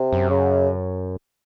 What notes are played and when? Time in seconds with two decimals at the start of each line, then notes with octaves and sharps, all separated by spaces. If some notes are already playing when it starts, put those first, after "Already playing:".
Already playing: C3
0.13 F#2
0.30 C#3